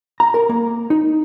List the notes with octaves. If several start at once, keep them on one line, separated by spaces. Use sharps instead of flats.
A#5
A#4
A#3
D#4